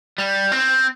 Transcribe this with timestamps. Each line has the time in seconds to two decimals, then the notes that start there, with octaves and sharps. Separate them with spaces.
0.18 G3
0.52 C4